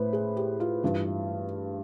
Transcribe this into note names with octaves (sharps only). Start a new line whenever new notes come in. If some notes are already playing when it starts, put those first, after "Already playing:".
Already playing: A2 B4 C5
G#4
G4
F4
G2 E3